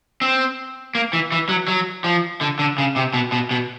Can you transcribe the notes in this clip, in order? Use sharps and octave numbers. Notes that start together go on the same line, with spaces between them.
C4
A#3
E3
E3
F#3
F#3
F3
D3
D3
C#3
C3
B2
B2
B2